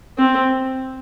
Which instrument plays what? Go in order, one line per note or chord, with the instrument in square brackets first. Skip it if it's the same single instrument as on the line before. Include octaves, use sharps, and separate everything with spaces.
[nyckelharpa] C4